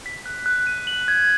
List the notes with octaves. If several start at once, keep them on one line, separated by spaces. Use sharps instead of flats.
B6
F#6
F#6
D#7
F#7
G#6